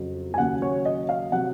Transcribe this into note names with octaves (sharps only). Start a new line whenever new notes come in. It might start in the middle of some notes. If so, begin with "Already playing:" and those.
Already playing: F2 C#3 F#3
G#5
D#2 C#3 F#3 F#5
C#5
D#5
F5
C3 F#3 F#5